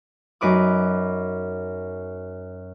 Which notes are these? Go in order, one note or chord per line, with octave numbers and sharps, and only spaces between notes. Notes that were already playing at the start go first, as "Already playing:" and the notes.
F#2 D#4 B4 D6 D#6